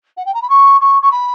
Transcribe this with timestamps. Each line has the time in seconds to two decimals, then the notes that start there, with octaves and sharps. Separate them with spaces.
0.17 F#5
0.26 G5
0.34 A#5
0.42 B5
0.50 C#6
0.81 C#6
1.02 C#6
1.12 B5